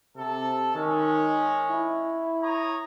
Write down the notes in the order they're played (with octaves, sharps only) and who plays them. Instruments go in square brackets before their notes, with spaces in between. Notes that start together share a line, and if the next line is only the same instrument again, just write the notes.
[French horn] C3 [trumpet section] A4
[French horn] D#3 [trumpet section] G#3 C#4
[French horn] E4
[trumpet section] C#5 A#5 D#6